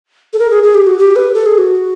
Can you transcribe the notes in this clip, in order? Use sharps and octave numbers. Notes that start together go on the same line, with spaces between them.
A4
A#4
G#4
G#4
G4
F#4
G4
B4
A4
G#4
F#4